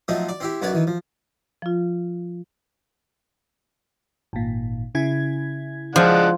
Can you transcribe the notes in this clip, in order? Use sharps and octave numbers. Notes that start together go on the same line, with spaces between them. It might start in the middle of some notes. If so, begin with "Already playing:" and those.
F3 F#3 A3 C4 D#4
D5
C4 E4 G4
B1 F#2 B3 F#4 C#5 D5
D#3 E3
F3
F3 F4
G#1 A#2
C#3 E4 G#6
F3 G#3 D4 F#5